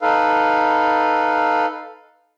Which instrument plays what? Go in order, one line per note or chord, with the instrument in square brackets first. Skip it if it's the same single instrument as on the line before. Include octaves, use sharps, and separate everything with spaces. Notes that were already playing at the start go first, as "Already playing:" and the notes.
[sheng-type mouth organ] D#4 A4 B4 F5